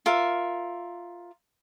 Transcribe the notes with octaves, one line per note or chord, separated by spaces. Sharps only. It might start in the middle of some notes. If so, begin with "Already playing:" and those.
F4 A#4 E5